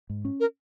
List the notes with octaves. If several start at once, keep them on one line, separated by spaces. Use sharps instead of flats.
G#2
C#4
A#4